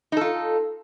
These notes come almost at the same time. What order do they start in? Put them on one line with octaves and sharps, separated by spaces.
D#4 A4 F4